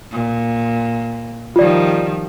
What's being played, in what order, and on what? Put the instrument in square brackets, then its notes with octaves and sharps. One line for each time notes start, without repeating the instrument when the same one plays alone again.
[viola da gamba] A#2
[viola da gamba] D#3 F3 G3 [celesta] F4 D5